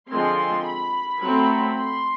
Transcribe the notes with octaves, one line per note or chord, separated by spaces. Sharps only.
D3 F3 G#3 C4 C6
B5
F#3 A3 C4
C6